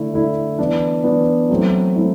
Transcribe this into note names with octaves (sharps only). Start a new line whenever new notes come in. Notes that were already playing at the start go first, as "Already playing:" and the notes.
Already playing: D3 A3 E4
D3 A3 E4
E3 B3 D4
E3 B3 D4
F#3 A3 C4 E4
A3 C4 E4